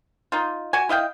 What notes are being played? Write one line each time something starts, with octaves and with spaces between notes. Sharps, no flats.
D#4 F4
F#4 G#5
E4 D#5 F5 G5